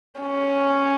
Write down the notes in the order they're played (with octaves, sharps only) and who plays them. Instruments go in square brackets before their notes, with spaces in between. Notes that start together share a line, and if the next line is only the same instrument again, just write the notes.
[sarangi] C#4